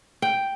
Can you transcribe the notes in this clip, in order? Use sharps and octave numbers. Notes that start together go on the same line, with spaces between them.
G5